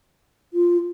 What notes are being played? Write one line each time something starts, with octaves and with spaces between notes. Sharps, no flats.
F4